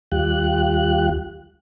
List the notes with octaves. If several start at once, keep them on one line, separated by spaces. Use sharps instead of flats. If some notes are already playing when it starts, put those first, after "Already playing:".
D#2 G3 F4 G4 F#6